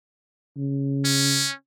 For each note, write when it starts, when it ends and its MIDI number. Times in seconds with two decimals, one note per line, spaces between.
0.57 1.47 49
1.05 1.53 61